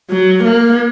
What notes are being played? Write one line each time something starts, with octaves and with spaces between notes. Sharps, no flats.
F#3
A#3